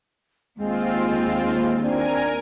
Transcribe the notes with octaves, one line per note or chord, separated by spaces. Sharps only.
D#2 G#3 C4 F4
C4 D4 A#4 G#5